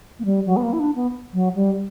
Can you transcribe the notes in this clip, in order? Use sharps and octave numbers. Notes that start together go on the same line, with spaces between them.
A#3
G3
F#3
B3
A#3
E4
D4
B3
F#3
G3